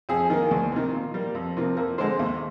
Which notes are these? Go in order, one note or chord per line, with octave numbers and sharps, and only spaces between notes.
F2 G#4
D#3 A#3
D2
C3 D#3
A#2
G3 A#3
F2
C3 F3 A#3
F2 A#4
D3 G#3 C4 C5
D#2